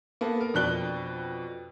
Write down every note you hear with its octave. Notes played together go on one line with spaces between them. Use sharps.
A#3 B3 A4
A#4
F2 B2 D4 F#6 G7